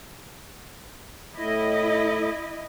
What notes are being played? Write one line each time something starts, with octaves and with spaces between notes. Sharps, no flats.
A2 E4 D#5